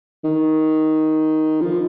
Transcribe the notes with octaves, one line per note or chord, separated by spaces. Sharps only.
D#3
F3